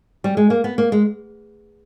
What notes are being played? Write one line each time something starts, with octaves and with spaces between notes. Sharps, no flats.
G3
G#3
A#3
B3
A#3
G#3